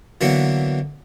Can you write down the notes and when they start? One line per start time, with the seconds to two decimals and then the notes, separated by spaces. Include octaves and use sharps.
0.21 D3 E3 F#3 A#3 B3